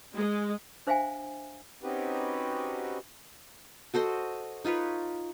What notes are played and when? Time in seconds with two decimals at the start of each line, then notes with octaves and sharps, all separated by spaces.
0.14 G#3
0.87 D4 C5 E5 F5 G5 G#5
1.83 C4 C#4 D#4 F#4 G4 B4
3.94 F#4 A4 C5 D#5
4.65 D#4 F4 B4 C#5